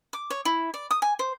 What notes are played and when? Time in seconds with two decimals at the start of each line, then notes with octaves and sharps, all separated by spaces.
0.13 D6
0.30 C#5
0.45 E4
0.74 D5
0.91 D#6
1.02 G#5
1.19 C5